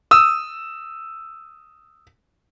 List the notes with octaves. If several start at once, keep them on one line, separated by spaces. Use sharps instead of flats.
D#6 E6